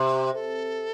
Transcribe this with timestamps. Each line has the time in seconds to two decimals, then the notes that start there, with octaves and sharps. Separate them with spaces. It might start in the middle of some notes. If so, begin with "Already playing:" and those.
Already playing: C3
0.12 G4
0.34 A4